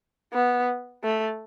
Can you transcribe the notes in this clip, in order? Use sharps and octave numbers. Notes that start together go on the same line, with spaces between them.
B3
A3